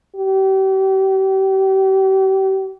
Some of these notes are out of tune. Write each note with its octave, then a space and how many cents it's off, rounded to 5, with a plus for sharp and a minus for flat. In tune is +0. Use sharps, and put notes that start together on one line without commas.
G4 -35